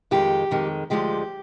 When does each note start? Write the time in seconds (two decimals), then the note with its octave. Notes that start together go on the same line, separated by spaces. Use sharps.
0.11 F2 D#3 G#3 G4
0.51 F2 D#3 G#3
0.90 D2 D3 F3 G#3 G4